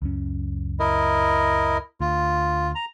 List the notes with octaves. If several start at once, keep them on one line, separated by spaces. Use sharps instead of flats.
C#2 F#2 C#4
E4 A#4 D#5
D2 F4
A#5